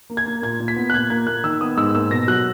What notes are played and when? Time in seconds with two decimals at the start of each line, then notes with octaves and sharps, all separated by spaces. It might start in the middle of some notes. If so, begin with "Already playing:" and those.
0.10 A#3
0.17 G#6
0.26 A#3
0.42 A#2 G#6
0.60 A#2
0.68 B6
0.76 B3
0.90 F#6
0.94 A#2 G#6
1.10 A#3 G#6
1.27 A#3 F#6
1.44 D#3 E6
1.61 B3 D#6
1.77 G#2 E6
1.95 A#3 E6
2.11 B2 A#6
2.28 F#3 F#6